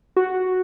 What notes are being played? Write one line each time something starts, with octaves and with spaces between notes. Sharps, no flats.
F#4